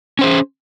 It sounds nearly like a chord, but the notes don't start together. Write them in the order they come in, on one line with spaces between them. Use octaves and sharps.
C#4 C5 G#4